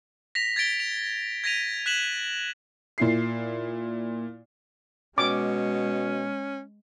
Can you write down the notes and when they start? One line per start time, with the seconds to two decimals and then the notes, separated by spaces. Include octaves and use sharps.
0.35 A#6 B6 F7
0.56 G#6 A6 B6 D7 G7
0.80 F7
1.44 G#6 A#6 B6 D#7 F7
1.86 F#6 B6 E7 F#7
2.98 A#2 E4 C7
5.18 B2 G#3 C#4 D6